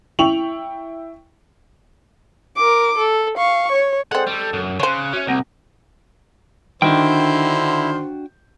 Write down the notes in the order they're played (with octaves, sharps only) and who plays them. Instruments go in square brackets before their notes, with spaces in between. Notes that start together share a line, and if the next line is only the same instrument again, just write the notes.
[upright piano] E4 G5 C#6 F7 F#7
[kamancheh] A#4 D6
A4
F5 C#6
C#5
[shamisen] G#3 C4 [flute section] G#4 C5 D5 [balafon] A4 [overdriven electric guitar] F#5
[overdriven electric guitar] G3 [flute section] A4 [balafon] C#6
[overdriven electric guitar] F#2
[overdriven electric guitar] C#3 [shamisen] C5 C#5 [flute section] F#6
[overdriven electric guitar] C#4 [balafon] F#4 E5
[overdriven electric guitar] C2 [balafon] A#3 C4 [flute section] F#5 A#5
[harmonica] D3 C5 [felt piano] D#3 [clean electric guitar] D4 F#4 G5 [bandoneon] E4